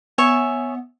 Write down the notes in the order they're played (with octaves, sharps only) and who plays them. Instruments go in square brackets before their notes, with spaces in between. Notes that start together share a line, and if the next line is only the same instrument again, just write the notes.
[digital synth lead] B3 [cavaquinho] C#5 E5 G#5